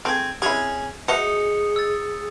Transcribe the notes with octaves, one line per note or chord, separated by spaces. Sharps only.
A3 C4 G#4 G#5
G#3 C4 C#4 E4 G#4
D#4 F#4 G#4 D#5 E5 D#6 C#7
E6 A6